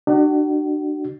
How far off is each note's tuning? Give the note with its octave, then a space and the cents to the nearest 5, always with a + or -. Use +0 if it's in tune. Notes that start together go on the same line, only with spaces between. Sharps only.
D4 +35 F#4 +40